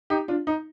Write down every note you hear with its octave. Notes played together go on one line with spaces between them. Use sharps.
D#4 G4
D4 F4
D#4